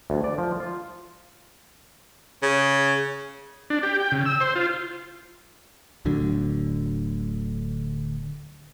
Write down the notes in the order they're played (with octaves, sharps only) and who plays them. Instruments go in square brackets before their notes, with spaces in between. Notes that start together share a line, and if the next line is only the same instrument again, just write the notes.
[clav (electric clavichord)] D2
D5
F3
F4
[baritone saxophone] C#3
[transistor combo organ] D4
G4
G5
C#3
E6
C5
F4
[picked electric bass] D1 D2 D3 F#3